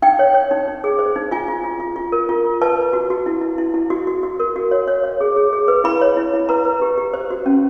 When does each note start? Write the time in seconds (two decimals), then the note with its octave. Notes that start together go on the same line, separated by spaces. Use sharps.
0.02 D#4 G5
0.19 C#5
0.34 C#5
0.51 D#4
0.68 D#4
0.84 G#4
0.99 C5
1.16 D#4
1.31 F4 G#5
1.48 F4
1.64 F4
1.80 F4
1.96 F4
2.12 A#4
2.29 F4
2.44 F4
2.61 B4 A5
2.77 B4
2.93 F#4
3.10 F#4
3.26 E4
3.41 E4
3.58 E4
3.74 E4
3.90 F#4
4.07 F#4
4.23 F#4
4.40 A#4
4.56 F#4
4.71 C#5
4.88 C#5
5.04 C#5
5.21 G#4
5.36 G#4
5.53 G#4
5.68 B4
5.84 E4 B5
6.01 C#5
6.17 E4
6.34 E4
6.49 B4 A#5
6.65 B4
6.81 G4
6.98 G4
7.14 C5
7.30 F#4
7.46 C#4